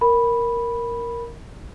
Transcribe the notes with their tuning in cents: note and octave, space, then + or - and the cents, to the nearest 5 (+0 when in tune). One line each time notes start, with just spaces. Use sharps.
A#4 +0 B5 -5